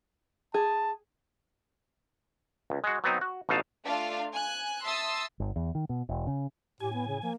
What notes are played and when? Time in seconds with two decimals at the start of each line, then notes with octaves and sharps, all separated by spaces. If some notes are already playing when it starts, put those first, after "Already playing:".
0.54 G#4 A5
2.70 C#2
2.84 G#3 F#4
3.04 F#3 B3 C4 D#4
3.21 F#4
3.49 A1 B2 D#4 F4 F5 A5
3.84 A3 D4 F4 F5
4.33 G#5 F#6
4.85 E5 A5 C6 D#6 E6 A6
5.40 G1
5.56 E2
5.75 D#3
5.89 B2
6.09 E1
6.27 C#3
6.80 A2 G4 G#5
6.93 B3
7.08 C#3
7.22 F3 A#3